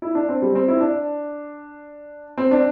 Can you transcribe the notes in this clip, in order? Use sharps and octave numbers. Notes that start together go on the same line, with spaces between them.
E4
D4
C4
G3
C4
E4
D4
C4
D4